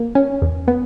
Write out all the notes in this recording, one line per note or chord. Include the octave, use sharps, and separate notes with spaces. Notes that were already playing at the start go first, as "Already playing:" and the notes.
Already playing: A#3
C#4
E2
B3